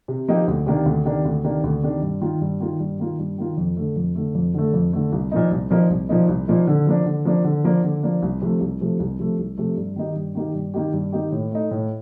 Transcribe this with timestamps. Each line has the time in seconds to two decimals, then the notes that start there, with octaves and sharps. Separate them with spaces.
0.08 C3
0.28 F3 A#3 D#4 G4
0.47 D2
0.66 C3 D#3 A#3 D4
0.86 D2
1.05 C3 D#3 A#3 D4
1.25 D2
1.44 C3 D#3 A#3 D4
1.64 D2
1.83 C3 D#3 A#3 D4
2.02 G2
2.21 D#3 A#3 F4
2.41 G2
2.60 D#3 A#3 F4
2.80 G2
2.99 D#3 A#3 F4
3.19 G2
3.38 D#3 A#3 F4
3.57 F2
3.77 D3 A3
3.96 F2
4.15 D3 A3
4.35 F2
4.54 D3 A3
4.73 F2
4.93 D3 A3
5.12 C2
5.31 A#2 F3 A#3 D#4
5.51 C2
5.70 A#2 F3 A#3 D#4
5.90 C2
6.09 A#2 F3 A#3 D#4
6.28 C2
6.48 A#2 F3 A#3 D#4
6.67 D3
6.87 F3 A#3 D4
7.06 D3
7.25 F3 A#3 D4
7.44 D3
7.64 F3 A#3 D4
7.84 D3
8.03 F3 A#3 D4
8.22 C2
8.42 C3 F3 A3
8.61 C2
8.80 C3 F3 A3
9.00 C2
9.19 C3 F3 A3
9.39 C2
9.57 C3 F3 A3
9.77 G2
9.96 D#3 A#3 D#4 G4
10.16 G2
10.35 D#3 A#3 D#4 G4
10.54 G2
10.74 D#3 A#3 D#4 G4
10.93 G2
11.12 D#3 A#3 D#4 G4
11.32 A2
11.52 A3 D#4
11.71 A2